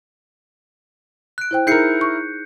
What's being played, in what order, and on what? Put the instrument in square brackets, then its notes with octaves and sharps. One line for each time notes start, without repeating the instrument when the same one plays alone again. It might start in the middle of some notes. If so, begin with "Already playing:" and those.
[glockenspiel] F#6 D7
[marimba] E4 C5 G5
[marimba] D#4 G#4 [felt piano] E4 A#4 [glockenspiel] G6 C7 C#7
[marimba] C#6